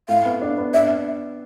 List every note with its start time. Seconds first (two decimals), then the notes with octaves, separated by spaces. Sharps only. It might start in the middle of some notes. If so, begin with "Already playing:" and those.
0.09 A2 F5
0.25 B3
0.41 D4
0.57 B3
0.74 D4 E5